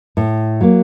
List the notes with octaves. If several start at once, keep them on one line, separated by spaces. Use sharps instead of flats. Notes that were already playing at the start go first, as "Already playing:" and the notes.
A2
F#3 A#3